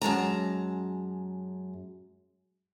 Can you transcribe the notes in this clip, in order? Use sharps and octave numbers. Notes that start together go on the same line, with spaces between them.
F#2 G#3 A5 A#5